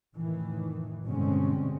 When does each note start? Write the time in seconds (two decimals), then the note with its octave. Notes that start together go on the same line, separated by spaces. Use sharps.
0.16 F1 A2 D#3 E3
1.05 G2 B2 D3 G#3 C4 C#4